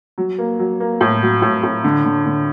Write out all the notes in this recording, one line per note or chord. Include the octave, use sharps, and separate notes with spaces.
F#3
A#3
F#3
A#3
A2
F#3
A2
A2
D3
D3
D3